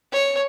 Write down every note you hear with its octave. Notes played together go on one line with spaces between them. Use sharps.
C#5